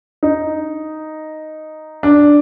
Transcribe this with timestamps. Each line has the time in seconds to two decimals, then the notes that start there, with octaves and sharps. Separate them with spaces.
0.23 D#4
2.03 D4